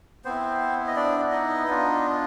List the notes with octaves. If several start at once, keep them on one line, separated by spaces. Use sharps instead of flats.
B3 C4 E4 C5
D#5
D4 D5
D#4 D#5
B3 D4 F4